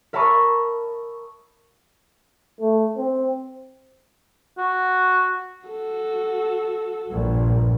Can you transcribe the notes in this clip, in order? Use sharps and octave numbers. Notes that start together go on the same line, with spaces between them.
A#4 E5 A5 B5 C#6 D#6
A3
C4
F#4
F#4 A4
A#1 G2